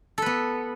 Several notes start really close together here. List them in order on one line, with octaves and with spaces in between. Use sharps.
A4 B4 B3